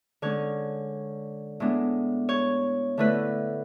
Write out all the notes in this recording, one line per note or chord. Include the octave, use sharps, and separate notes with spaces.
D3 G#3 C#4 C#5
A2 G#3 B3 D4
C#5
D3 A3 E4 B4